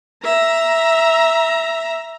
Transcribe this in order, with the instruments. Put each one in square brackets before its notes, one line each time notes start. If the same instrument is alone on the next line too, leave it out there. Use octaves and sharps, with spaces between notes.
[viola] E5 A#5